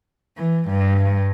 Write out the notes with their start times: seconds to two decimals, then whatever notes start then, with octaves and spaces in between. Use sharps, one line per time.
0.38 E3
0.68 G2